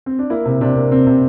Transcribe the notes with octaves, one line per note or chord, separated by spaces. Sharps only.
C4
D4
A#3 E4
C3
C3 D4
A#3
C3 C4
C3